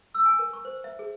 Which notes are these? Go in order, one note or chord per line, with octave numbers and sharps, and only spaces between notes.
E6
G#5
A#4
C#6
C5
E5
G#4